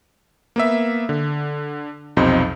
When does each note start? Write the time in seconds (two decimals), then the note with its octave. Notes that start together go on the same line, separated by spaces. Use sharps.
0.56 A#3 B3 E5
1.09 D3
2.17 B1 F2 C3 D#4 C5